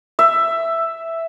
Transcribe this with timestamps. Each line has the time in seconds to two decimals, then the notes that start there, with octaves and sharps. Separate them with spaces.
0.19 E5